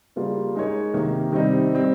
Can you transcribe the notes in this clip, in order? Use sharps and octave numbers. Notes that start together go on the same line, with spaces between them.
C#3 G3 A#3 F4
G#3 D#4 A#4 C#5
C3 D#3 A#3
C3 D#3 G3 C4 D#4
G3 C4